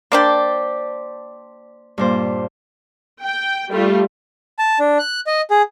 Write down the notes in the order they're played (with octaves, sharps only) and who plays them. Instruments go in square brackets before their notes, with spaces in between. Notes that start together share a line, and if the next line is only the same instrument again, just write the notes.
[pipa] A#3 D4 G4 [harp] C5 D5 A5
[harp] G2 A#2 C5
[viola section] G5
G3 A3 F4
[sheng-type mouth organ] A5
D4
F#6
D#5
G#4